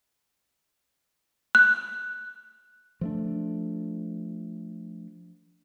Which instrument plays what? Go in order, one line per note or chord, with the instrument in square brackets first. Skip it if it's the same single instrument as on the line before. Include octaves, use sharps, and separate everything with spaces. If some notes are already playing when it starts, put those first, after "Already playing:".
[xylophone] F#6
[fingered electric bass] F3 A3 D4